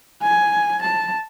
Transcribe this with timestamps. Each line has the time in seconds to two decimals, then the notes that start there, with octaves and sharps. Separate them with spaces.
0.23 G#5
0.82 A5